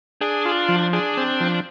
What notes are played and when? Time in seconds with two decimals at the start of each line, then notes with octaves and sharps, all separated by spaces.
0.21 D4 G#4
0.45 F4
0.69 F3
0.93 D4 G#4
1.17 C4
1.40 F3